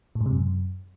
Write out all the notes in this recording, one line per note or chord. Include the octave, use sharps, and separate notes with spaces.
A2
G#2
C3
F#2